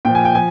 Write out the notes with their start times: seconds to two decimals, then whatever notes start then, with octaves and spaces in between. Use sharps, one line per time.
0.05 A#2 F3 G5
0.15 G#5
0.25 G5
0.35 F3 G#5